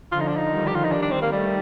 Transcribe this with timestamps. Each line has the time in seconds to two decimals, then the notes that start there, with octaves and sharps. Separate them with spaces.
0.11 D3 F3 F4
0.20 D#4
0.28 D4
0.37 D#4
0.51 D#3 G3
0.67 G4
0.75 F4
0.84 D#4
0.91 D#3 G3 D4
1.02 D4
1.11 C4
1.22 A#3
1.32 G3 A3